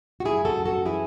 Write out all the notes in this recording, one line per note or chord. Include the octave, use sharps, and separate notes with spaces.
F#4
F#2 E4 G#4
F#4 A4
F#2
F#4 A4
E3 E4 G#4